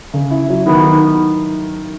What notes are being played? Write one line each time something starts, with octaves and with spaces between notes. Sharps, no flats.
C#3
E4
F#3
D#3 B3
D#3